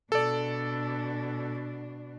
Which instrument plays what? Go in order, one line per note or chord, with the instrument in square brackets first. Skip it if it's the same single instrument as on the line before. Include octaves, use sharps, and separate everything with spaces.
[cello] B2 D4 [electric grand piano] A4 D5